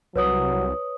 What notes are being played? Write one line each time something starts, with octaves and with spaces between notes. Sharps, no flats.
C2 F#3 B4 C#5 D#6